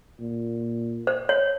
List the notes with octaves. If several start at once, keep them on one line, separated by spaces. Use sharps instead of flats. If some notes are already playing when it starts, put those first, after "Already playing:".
A#2
C5
C#5